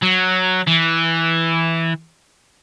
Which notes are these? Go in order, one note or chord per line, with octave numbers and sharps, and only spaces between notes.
F#3
E3